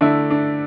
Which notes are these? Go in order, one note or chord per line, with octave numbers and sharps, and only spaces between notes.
D3 A3 D4 E4
D4